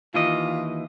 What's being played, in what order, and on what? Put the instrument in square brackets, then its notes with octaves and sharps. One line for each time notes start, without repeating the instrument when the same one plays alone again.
[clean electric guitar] D#2 E3 D#5 [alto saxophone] F4